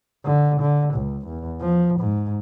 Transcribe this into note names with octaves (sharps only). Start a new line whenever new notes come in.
D3
D3
C#2
E2
F3
G#2